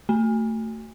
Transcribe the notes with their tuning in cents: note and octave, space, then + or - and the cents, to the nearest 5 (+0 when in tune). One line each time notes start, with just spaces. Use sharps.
A3 +20